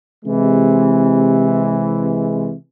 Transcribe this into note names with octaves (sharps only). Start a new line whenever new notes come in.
C3 E3 G#3